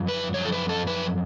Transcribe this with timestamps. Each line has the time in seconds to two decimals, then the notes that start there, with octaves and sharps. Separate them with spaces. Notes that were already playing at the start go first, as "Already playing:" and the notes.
Already playing: F#2 F3
0.08 B4
0.34 F#2 F3 C#5
0.45 A4
0.52 B4
0.69 A4
0.87 B4